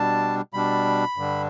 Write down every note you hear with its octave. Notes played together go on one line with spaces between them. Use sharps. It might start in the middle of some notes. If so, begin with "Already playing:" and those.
Already playing: B2 G3 D4 A5
B2 G3 D4 B5
G2 D3 G3 D4